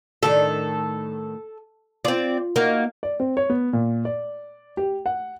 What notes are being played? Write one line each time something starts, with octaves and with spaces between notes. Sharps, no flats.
A2 D#3 D4 A4
C4 F4 D5
A#3 D#4 F#4
D5
C4
C#5
B3
A#2
D5
G4
F#5